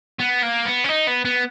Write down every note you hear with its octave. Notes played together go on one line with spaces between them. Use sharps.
B3
A#3
B3
C#4
D#4
B3
B3